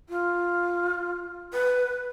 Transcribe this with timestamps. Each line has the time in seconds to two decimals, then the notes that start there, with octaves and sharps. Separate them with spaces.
0.09 F4
1.53 B4